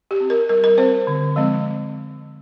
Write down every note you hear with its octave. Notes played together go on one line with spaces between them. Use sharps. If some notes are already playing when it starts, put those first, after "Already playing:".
G4
C4
A#4
G3 A#4
A#4
C4 C5
D3
F3 G#3 C4